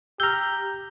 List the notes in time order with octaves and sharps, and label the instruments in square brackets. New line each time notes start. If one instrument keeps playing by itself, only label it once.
[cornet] G4 [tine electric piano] A#5 G6 [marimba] E6 F6